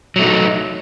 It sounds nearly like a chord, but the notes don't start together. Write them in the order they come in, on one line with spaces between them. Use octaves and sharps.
F#3 A3 D#4